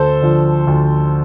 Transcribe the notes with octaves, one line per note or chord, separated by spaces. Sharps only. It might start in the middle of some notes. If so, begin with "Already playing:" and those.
Already playing: D2 A4 C5
D3 F3
D2